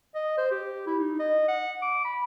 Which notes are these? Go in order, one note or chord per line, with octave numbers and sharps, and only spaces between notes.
D#5
C5
G4
E4
D#4
D#5
F#5
D6
B5